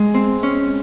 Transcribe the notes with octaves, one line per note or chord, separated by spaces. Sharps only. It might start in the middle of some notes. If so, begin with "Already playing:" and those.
Already playing: G#3
C4
C#4